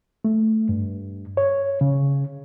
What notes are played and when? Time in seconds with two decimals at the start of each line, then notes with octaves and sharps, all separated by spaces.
0.25 A3
0.69 G2
1.37 C#5
1.81 C#3